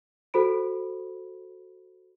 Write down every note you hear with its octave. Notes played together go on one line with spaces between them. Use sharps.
F#4 A4 C5 B5 D7